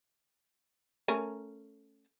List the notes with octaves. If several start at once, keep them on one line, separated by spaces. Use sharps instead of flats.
A3 C#4 A#4